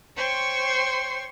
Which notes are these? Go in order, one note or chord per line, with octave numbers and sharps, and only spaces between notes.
C5 C#5 G5 C6 C#6